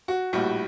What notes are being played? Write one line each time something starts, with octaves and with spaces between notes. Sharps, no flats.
F#4
A#1 A2 G3 F#4